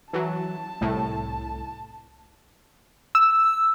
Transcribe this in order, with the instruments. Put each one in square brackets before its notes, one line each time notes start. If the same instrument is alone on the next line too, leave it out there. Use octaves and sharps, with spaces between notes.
[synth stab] E3 F#3 [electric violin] A5
[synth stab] C2 A2
[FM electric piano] E6